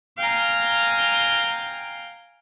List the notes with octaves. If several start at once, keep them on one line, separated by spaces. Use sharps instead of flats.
F5 G5 G#5 A#5